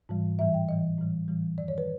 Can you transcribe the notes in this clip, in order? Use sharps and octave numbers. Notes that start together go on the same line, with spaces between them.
G#2 E3 G3
A2 E3 G3 E5
G5
A2 E3 G3 D#5
A2 E3 G3
A2 E3 G3
F#2 D#3 G3 D5
C#5
B4